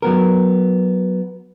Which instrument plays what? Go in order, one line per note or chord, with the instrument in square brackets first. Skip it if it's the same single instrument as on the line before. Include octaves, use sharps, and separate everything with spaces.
[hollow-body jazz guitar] F#3 B3 A#4